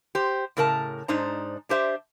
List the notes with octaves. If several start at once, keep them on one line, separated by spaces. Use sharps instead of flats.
G4 C5
A2 C#3 A#4 D#5 A5
G#2 D4 D#4 C5 A#5
D4 G4 C5 E5